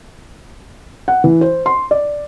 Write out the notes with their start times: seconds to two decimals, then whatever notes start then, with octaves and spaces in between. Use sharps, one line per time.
1.08 F#5
1.24 E3
1.41 C5
1.66 C6
1.91 D5